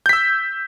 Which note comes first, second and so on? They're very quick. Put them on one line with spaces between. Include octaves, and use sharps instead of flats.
G6 B6 E6